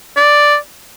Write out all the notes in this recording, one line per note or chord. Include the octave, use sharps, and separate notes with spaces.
D5